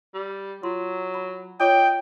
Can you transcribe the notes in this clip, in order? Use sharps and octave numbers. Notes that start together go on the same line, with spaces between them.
G3
F#3 F4 C6
B5
F4 C#5 D#5 G5 D6